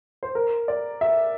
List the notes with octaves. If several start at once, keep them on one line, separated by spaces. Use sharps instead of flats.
C5
A#4
D5
E5